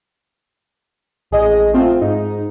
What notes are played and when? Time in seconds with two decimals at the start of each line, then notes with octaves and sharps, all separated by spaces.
1.31 A1 G#4 D#5
1.73 A3 C4 F4
2.01 G#2 D#4